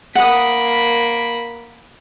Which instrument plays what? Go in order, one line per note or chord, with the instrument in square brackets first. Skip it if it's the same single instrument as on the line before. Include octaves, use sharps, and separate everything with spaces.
[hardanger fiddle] A#3 B5 [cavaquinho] F#5 D#6